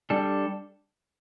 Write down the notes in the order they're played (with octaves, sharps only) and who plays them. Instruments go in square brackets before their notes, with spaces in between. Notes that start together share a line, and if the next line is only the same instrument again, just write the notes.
[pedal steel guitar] G3 D4 A4